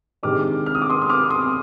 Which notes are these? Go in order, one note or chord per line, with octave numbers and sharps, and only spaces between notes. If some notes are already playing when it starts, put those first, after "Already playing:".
C3 D#3 G#3 D4 D6 F6
F6
D#6
D6
C6 D#6
D#6
D6 F6
C6 D#6